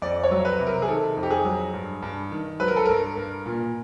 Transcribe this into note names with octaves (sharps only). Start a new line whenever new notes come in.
F2 D5
C#5
F#3
B4
C3
A#4
G#4
D#3 A4
F2
G4
G#4
F#3
G2
G2
D#3
F#3 B4
A#4
A4
G2 A#4
G2
A#2